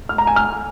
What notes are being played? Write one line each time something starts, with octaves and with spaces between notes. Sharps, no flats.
F6
A#5
G#5
F6